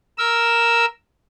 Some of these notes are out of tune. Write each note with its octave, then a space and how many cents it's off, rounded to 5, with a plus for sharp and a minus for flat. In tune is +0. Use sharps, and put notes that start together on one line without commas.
A#4 +0 E6 +0